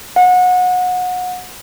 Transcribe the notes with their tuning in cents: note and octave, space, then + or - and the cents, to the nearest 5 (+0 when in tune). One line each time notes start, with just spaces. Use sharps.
F#5 -25